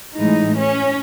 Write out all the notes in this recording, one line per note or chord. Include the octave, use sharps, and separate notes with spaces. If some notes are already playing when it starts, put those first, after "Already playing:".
A2 E3 G#3 D#4
C#4